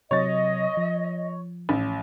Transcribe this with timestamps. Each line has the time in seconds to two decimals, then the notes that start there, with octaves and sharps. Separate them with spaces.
0.11 C3 F#3 C#5 D#5 A6
0.77 F3
1.69 A1